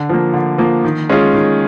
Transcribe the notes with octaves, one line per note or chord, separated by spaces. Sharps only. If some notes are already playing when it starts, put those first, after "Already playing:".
Already playing: D3
F3 A#3
D3
F3 A#3
D#3
G#3 C#4 F4 G#4
D#3